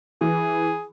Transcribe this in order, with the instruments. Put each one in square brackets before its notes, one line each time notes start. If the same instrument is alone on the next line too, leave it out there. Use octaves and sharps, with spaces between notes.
[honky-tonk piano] E3 [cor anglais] G#4